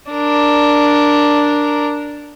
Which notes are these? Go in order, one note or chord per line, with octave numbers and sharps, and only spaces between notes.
D4 A#4